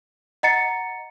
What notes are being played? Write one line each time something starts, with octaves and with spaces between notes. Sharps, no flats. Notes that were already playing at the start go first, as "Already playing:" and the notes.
D#5 F#5 A#5 A6 C#7